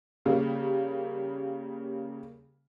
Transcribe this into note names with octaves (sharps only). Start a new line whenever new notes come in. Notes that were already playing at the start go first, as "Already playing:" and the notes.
C#3 G3 A#3